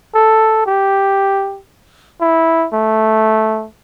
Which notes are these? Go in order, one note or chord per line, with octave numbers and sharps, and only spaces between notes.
A4
G4
E4
A3